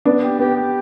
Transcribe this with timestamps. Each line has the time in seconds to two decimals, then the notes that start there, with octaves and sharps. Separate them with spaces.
0.05 B3 D4
0.23 G4
0.39 B3 G4
0.57 G4